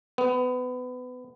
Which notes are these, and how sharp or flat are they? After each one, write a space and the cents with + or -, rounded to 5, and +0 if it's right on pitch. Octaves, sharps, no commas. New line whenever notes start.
B3 +25